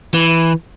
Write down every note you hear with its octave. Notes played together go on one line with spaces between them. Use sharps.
E3